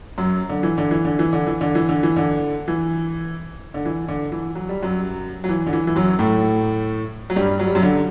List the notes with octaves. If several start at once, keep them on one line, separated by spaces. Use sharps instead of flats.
F#2 F#3
D3
E3
D3
E3
D3
E3
D3
E3
D3
E3
D3
E3
D3
E3
D3
E3
D3
E3
F#3
G3
F#2 F#3
F#3
E3
D3
E3
E3
F#2 F#3
A2 A3
F#3
G2 G3
F#3
G3
F#2 F#3
D3